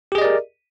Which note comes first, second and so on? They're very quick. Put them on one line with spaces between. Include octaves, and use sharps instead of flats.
G4 G#4 D#5 D5 A#4